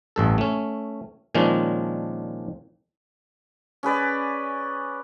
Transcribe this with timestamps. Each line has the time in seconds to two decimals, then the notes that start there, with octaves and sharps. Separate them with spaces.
0.16 A1 G2 A4
0.38 A3 C#4
1.35 A#2 D#3 F3 G#3 C#4 D4
3.83 C#4 G#4 B4 D5